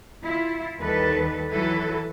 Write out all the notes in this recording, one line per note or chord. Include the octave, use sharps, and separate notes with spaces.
E4 F4
D#2 G3 A4 B4
E3 F#3 E4 A4 B4